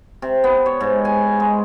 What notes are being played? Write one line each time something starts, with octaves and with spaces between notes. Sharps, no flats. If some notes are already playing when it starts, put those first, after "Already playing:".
C3
B3
C#5
G#2
G#5
G#3